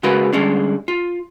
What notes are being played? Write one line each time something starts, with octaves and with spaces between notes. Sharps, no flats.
C#3 G#3 F#4 A#4 B4
D3 G3 G#3 C#4 D4
F4